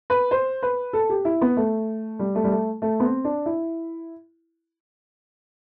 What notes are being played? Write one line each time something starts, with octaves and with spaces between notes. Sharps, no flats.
B4
C5
B4
A4
G4
E4
B3
A3
G3
A3
G3
A3
A3
B3
C4
D4
E4